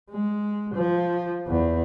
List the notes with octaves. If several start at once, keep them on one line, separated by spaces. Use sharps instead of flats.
G#3
F3
E2